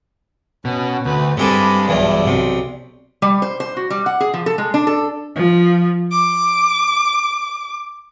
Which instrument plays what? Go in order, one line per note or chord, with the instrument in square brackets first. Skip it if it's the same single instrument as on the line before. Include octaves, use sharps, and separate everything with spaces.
[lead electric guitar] B2 [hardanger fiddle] C#4
[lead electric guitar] D2 [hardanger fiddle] B4
[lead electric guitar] G2 [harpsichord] C3 G4 A4 [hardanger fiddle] G#3 B5
[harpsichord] B1 E2 E3 [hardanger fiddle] D5
[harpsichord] B1 C3
[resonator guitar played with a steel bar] G3
C5
C5
F#4
G3
F#5
G#4
F3
A4
G#3
D4
A4
[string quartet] F3
D6